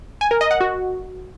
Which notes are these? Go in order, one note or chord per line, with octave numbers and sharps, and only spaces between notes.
G#5
A#4
D#5
F#5
F#4